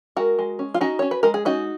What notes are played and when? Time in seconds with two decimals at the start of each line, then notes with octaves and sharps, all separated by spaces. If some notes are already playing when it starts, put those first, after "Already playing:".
0.16 G#3 F#4 A#4
0.39 G#3
0.59 C#4
0.74 F4
0.81 C#4 D#4 F#4
0.99 C#4 C#5
1.11 B4
1.23 G#3 A#4
1.34 G#4
1.45 C#4 D#4 F#4